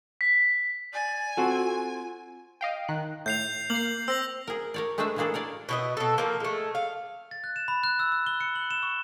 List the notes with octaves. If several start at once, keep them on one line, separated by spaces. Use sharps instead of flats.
B6
D5 G#5
C4 F4 F#4 A4
D#5 F5 G5
D#3 F#6
A2 G6 C7 F7
A#3 C7 F#7
C4 E6 A#6 F#7
G#4 A#4
A#4 C#5 D5
G#3 A3 D4 B4 C5 E5
E3 A3 A#3 D4 G#4 A4
A#4 C#5 D5 G#5
B2 E4 D#5
B2 A4
F3 A#3
G#3 A3
F5
A6
F#6
E7
B5
F#6
E6
E6
G7
C#7
F#7
E7
C#6